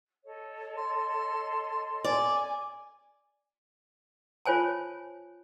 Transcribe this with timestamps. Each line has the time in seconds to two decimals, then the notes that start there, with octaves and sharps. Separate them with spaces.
0.24 A4 C#5 D#5
0.76 C6
2.04 D5 G#5
4.46 F4 C5 C#5 G#5 A5